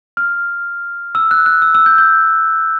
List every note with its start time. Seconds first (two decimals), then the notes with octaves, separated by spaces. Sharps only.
0.17 F6
1.15 E6
1.31 F#6
1.46 F#6
1.62 E6
1.75 E6
1.86 G6
1.98 G6